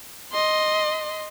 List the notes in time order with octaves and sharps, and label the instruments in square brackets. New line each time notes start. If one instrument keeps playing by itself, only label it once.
[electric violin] D#5 C6